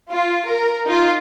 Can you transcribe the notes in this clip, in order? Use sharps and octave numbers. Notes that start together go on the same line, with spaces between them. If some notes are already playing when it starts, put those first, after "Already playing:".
F4
A#4
D#4 F4